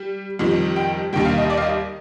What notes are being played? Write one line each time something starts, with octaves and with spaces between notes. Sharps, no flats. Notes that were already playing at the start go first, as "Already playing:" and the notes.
Already playing: G3
F2 D#3 G3
G5
D#2 D#3 G3 G5
F5
D#5
D5
F5
D#5